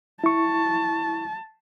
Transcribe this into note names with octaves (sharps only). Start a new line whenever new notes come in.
E4 A5 C#6